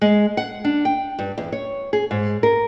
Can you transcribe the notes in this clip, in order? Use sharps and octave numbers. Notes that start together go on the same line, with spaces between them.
G#3
F#5
D4
G5
G2
E2
C#5
G#4
G#2
A#4